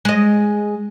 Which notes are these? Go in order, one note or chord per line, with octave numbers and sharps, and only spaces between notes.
G#3 D#5